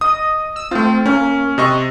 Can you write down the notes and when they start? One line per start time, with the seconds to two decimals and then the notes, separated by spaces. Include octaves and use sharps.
0.01 D#5 D#6
0.56 E6
0.71 A3 C4 F4
1.06 A#3 C#4
1.58 C3 D#5 C#6 D#6